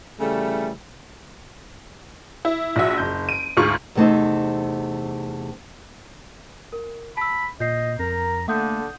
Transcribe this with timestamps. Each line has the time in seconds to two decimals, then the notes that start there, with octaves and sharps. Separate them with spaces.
0.20 C#3 E3 G3 A3
2.45 E4
2.76 A#1 F#4 E5
2.98 F#1 G6
3.29 D7 D#7
3.57 D2 G#2 F4 C#6
3.95 E2 C3 A3 C4 D#4
6.73 A#4
7.17 A5 B5 E6
7.60 A#2 D#5 G6 C7
7.99 F2 A#4 A#5
8.48 D3 A3 A#3 F#5 D#6 G6